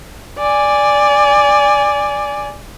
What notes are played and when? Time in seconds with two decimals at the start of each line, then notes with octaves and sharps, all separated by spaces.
0.39 D5 G#5